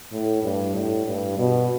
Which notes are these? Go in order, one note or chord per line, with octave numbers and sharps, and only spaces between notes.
A2
G2
A2
G2
B2